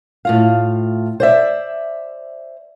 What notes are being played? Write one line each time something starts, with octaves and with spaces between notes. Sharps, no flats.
A2 F4 F5
C5 D5 E5